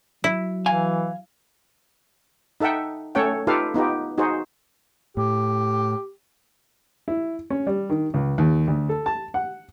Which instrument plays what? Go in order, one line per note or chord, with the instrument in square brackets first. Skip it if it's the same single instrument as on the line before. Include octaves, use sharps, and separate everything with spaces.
[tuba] F#3 [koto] E4
[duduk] E3 [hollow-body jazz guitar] F5 G#5
[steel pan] D#4 A4 E5 F#5 G5
A3 C#4 A4 C#5 F#5 G5
D#4 F4 G4 A4 B4 F5
B3 D#4 F4 G4
D#4 F#4 G#4 C5
[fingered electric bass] A2 [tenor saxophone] G4
[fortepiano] E4
C#4
G3
D#3
C#2
D#2
D2
A4
A5
F#5